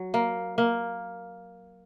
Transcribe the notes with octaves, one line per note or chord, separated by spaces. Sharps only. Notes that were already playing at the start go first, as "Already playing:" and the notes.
Already playing: F#3
A#3
A#3